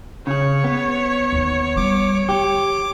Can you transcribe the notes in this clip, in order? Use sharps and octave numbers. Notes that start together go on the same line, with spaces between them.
C#3 G#4 C#5
B3
D#2 D3
G3 D6
D3 G4 D6